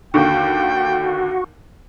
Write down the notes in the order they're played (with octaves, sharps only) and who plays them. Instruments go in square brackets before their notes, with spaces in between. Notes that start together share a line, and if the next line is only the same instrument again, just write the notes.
[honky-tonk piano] D#2 D3 [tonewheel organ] F#4 [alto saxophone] G5